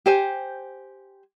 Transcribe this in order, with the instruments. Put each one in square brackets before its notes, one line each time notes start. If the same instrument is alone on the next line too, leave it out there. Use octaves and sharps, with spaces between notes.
[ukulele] G4 C5 G#5